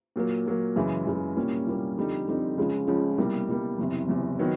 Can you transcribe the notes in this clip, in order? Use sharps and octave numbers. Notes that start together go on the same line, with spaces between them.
A#2 F#3 A#3
A#2 F#3 A#3
F#2 C#3 E3 G#3
F#2 C#3 E3 G#3
C2 A#2 G3 A#3 C#4
C2 A#2 G3 A#3 C#4
F2 D3 G3 C4 D#4
F2 D3 G3 C4 D#4
C#2 C#3 F3 G#3 C#4
C#2 C#3 F3 G#3 C#4
C2 B2 G3 A#3
C2 B2 G3 A#3
F#1 E2 C3
F#1 E2 C3
D#3 F#3 B3